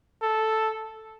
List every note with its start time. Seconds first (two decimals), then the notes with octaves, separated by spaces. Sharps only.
0.22 A4